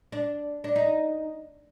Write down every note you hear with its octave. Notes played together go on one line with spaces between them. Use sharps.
D4
D4
D#4